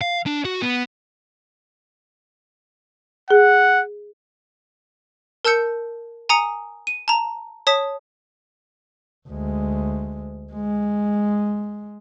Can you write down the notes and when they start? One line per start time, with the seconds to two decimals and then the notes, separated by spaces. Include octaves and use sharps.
0.01 F5
0.26 D4
0.45 F#4
0.62 B3
3.30 G#4 F#5
5.45 A#4 A5 E6 G6 C#7
6.29 G#5 A#5 D#6 C#7
6.87 D#7
7.08 A5 A#5
7.67 C#5 A5 D#6 B6
9.29 D2 G#3
10.53 G#3